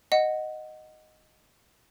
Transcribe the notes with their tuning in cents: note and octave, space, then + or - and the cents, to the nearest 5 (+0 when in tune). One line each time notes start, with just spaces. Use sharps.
D#5 -5 F#5 +0